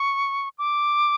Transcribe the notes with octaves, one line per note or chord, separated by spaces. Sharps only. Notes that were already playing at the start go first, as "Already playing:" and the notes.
Already playing: C#6
D6